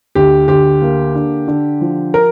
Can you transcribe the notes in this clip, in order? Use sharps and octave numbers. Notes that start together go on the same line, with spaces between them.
D2 G4
D2 G4
A#3
D3
D3
F3
A#4